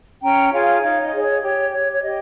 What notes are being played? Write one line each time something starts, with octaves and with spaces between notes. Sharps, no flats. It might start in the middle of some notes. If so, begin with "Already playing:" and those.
C#4 G5 A#5
F4 G#4 C#5 F5 G#5
D#4 C#5 F5
D#5
G#4 C#5
C#5
G4 C#5
C#5
C#5
G4 D#5